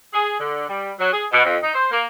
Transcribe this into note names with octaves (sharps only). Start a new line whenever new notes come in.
G#4
D3
G3
F#3
G#4
B2
F2
D#4
C5
A#3